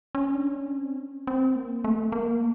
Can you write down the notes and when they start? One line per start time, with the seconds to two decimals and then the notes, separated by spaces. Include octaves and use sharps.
0.15 C#4
0.35 D4
0.56 C#4
0.78 C4
0.99 C#4
1.27 C4
1.56 A#3
1.84 A3
2.12 A#3